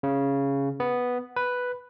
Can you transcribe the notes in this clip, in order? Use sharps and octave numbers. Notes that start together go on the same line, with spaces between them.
C#3
B3
B4